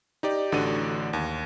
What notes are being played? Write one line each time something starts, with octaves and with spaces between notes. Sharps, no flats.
D#4 G4 D5
A1 D3 D4 F#4 D5 D#7
D#2